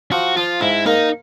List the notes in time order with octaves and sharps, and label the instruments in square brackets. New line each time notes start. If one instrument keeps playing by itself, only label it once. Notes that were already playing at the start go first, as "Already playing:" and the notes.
[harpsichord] F3 [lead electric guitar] F#4
[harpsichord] F3 [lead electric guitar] F4
[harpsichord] G#2 [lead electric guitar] E4
[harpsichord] A#3 [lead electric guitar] D#4